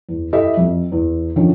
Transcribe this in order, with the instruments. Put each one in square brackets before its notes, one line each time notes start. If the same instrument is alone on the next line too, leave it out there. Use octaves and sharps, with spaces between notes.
[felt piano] E2
E4 G4 A4 D#5 E5
F2
E2
D3 D#3 F3 C#4